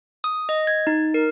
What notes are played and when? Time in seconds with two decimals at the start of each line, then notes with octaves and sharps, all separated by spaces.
0.24 D#6
0.49 D#5
0.67 G#6
0.87 D#4
1.14 A#4